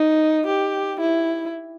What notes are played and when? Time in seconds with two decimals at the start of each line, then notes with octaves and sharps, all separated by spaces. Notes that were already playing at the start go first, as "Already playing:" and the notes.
Already playing: D#4
0.47 G4
1.01 E4